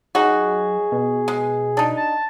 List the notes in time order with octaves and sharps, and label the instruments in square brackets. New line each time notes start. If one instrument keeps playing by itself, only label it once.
[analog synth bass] F#3 [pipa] D#4 F#4 [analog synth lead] G#4
[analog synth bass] B2
[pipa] G#3
D4 D#4
[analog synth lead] A5